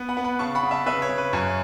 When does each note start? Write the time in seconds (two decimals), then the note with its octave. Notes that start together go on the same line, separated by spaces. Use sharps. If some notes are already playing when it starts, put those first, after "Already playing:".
Already playing: B3
0.09 F#5 B5
0.17 B3
0.24 F#5 B5
0.39 C#3 A5 C#6
0.55 F#5 B5
0.63 C#3
0.71 E5 A5
0.86 C#3 B4 E5
1.02 C#5
1.09 C#3
1.18 B4
1.33 F#2 C#5